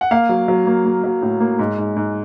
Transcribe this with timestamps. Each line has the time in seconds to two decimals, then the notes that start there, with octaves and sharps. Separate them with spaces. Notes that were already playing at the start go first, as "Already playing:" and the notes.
0.01 F#5
0.11 A#3 F5
0.29 F#3
0.48 F#3
0.67 A#3
0.85 A#3
1.04 F#3
1.22 A2
1.40 A#3
1.59 G#2
1.78 G#2
1.96 G#2